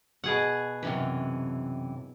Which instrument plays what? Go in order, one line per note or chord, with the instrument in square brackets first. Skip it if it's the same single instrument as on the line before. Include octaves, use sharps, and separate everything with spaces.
[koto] B2 G#4 F#5
[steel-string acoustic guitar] F#2 C3 E3